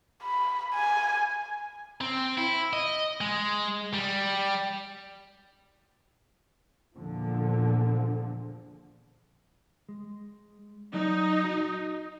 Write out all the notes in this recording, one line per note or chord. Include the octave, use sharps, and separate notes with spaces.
B5
G#5
C4
E4
D#5
G#3
G3
E2 A#2 D3 F3
G#3
F#3 D#4 D5
F#4 D#5